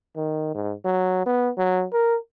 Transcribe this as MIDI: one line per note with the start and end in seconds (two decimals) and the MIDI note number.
0.16 0.52 51
0.54 0.73 44
0.85 1.22 54
1.26 1.50 59
1.58 1.85 54
1.93 2.16 70